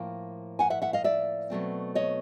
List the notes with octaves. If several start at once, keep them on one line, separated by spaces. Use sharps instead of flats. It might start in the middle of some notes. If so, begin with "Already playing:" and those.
Already playing: A2 F3 A#3 F5 G5
F#5 G#5
E5 F#5
E5 F#5
D#5 F5
D5 E5
B2 F#3 A3 C4
C#5 D#5